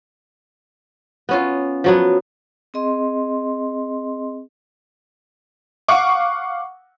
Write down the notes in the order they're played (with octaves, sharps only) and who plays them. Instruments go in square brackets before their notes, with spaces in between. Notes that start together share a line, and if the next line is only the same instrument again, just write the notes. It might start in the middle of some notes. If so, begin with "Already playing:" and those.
[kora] B3 C#4 F4
F3 F#3 B3
[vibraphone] C4 G#4 D#5 C6
[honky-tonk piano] F5 F#5 C#6 D6